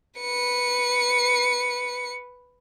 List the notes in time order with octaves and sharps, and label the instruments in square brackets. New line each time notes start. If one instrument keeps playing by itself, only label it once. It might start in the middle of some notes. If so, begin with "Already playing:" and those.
[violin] B4 C#7